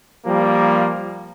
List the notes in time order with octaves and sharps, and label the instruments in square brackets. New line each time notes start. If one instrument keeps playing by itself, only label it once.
[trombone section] F3 G3 A#3